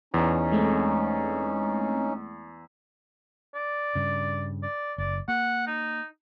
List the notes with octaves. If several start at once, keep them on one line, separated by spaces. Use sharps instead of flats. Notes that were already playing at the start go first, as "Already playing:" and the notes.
E2 C#4 D#4
G#3 A3 C4
D5
G2 C#3
D5
F#1 D5
A#3 F#5
D#4